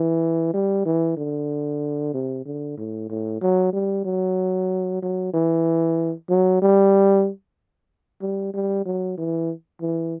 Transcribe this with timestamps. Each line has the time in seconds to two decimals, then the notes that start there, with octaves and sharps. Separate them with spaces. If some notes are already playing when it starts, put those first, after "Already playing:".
Already playing: E3
0.54 G3
0.86 E3
1.17 D3
2.14 C3
2.45 D3
2.77 A2
3.09 A2
3.41 F#3
3.73 G3
4.05 F#3
5.02 F#3
5.34 E3
6.29 F#3
6.62 G3
8.21 G3
8.54 G3
8.86 F#3
9.17 E3
9.81 E3